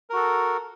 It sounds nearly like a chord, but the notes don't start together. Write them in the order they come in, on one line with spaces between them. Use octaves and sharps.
A#4 F#4 A4